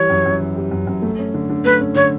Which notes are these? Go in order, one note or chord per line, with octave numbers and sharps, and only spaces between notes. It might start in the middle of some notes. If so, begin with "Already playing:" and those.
Already playing: E3 G3 C#5
F#2
F#2
E3
G3
F#2
F#2
A3
C#4
D3
D3
A3 B4
C#4
D3 C#5